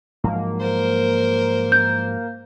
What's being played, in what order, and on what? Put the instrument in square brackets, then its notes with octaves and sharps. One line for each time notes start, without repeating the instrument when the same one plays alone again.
[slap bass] G#2 F3 F#3 [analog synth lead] A#3
[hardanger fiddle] A#4 C5
[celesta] G6